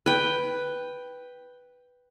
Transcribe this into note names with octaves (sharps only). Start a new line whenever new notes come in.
B4 G5